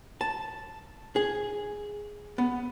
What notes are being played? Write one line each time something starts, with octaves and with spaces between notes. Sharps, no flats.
A5
G#4
B3